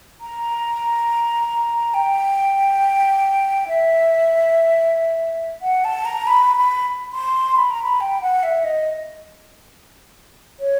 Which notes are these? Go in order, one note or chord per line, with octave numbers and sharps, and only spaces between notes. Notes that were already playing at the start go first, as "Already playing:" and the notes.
A#5
G5
E5
F#5
A5
A#5
B5
B5
C6
B5
A#5
B5
G5
F#5
E5
D#5
C#5